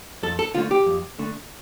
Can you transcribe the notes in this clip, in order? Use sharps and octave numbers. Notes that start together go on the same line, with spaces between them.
F2 A4
A4
D3 A3 F4
G4
F2
D3 A3